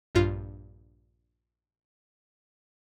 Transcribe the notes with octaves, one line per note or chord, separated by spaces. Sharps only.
A#1 G2 F4 C7